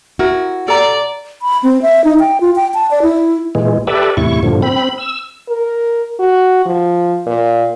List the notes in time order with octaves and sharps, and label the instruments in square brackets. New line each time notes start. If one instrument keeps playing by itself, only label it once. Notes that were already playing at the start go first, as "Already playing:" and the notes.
[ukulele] E4 A#4 [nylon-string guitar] F#4
[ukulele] A4 A#5 [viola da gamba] D5
[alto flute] B5
C4
E5
D#4
G5
F4
G5
A5
D5
E4
[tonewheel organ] A#2 E3 G#3
G4 A4 B4 D5 E5
E2 A2 C3 E4 C#6
G2 A#2 D3 F3
C4 B5
E6
[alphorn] A#4
F#4
F3
A#2